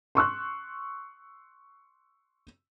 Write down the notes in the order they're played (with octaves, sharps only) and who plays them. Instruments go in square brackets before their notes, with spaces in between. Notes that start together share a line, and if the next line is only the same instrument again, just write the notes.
[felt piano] C6 C#6 E6 F#6